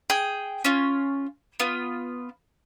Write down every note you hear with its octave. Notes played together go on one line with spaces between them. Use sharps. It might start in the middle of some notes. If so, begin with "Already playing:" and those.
G#4 G5
C#4 F4
B3 F4